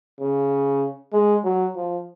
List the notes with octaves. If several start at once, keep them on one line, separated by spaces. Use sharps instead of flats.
C#3
G#3
F#3
F3